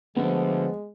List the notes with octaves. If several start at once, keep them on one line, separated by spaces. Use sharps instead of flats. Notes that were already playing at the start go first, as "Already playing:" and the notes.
D2 D3 F3 G#3 B3